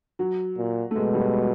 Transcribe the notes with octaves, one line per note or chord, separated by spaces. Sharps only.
F#3
A#2
A3
B2 G#3
G3
G#3